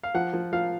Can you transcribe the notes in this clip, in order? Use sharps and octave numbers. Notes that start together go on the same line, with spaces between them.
F5
F3 F#5
F3
F3 F5